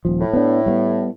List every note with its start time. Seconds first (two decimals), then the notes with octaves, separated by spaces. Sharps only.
0.05 D#1 F3
0.21 A2
0.33 B3 D4
0.66 G3 A#3 B3